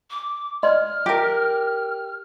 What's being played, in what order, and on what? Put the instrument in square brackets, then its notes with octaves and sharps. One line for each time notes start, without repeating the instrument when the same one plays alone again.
[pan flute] D6
[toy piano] D5 D#5 C6 [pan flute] F6
[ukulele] G4 A#4